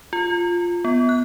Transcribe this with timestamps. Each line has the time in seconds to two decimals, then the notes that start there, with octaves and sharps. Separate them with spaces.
0.13 F4
0.85 B3
1.09 F#6